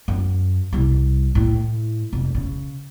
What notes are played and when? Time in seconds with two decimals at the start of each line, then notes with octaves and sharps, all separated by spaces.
0.08 F#2
0.73 C2 G3
1.35 A2
2.13 F1
2.35 C#3